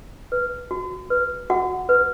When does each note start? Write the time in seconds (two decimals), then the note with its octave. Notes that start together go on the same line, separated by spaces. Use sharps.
0.32 B4
0.71 F#4
1.10 B4
1.50 F#4 F#5
1.89 B4